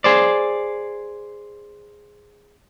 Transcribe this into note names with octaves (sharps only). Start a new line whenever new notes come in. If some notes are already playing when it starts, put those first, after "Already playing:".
G#4 C5 D5